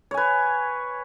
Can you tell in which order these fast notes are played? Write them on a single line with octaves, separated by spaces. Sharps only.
C#5 G#5 B4